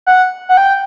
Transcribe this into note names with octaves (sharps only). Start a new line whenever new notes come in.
F#5
F#5
G5